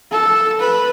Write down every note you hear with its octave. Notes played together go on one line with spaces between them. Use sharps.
A4
B4